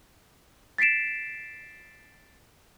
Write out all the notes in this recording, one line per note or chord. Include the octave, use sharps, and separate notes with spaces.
A6 B6 C7 D7 E7